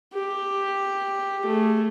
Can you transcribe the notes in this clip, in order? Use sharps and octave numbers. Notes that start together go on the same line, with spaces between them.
G4
A3 G#4